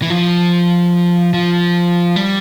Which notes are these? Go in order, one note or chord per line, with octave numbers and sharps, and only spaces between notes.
E3
F3
F3
G3